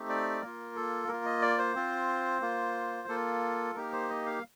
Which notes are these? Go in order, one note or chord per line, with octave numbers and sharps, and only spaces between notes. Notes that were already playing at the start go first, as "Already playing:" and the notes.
Already playing: A3 C4 D#4 G4
D5
A#3 F4 A#4
A4
A#3 F4 A#4
D#5
D5
C5
C4 F4
A#3 F4
A#3 F4 A4
A#3 D#4 G4 A#4
C5
D#5
F5